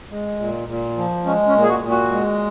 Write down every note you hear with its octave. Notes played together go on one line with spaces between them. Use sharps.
G#3
A#2
A#2
F3
G#3 C#4
C#4
A#2
G#4
F#4
A#2
F#4
G#3